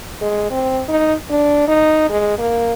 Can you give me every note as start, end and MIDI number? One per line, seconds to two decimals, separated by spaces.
0.22 0.47 56
0.51 0.81 60
0.89 1.14 63
1.30 1.65 62
1.67 2.05 63
2.09 2.37 56
2.39 2.73 58